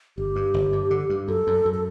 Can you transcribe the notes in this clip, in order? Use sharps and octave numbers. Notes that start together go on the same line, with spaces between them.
G1 G4
G2
G1
G2
D3
G2
F#2 A4
F#2
F#2
A4